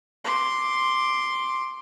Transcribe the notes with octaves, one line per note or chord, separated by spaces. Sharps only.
C6 D6